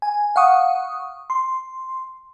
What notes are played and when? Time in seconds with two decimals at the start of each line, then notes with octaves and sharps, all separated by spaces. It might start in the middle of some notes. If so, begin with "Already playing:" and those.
0.02 G#5
0.36 F5 F#5 C#6 D#6
1.30 C6